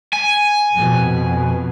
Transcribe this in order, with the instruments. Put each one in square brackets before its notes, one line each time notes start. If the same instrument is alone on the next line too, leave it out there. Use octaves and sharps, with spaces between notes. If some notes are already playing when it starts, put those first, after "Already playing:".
[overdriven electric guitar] G#5
[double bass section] F2 B2